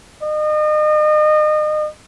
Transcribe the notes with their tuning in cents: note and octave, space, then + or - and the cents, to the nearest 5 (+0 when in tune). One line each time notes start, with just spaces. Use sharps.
D#5 -35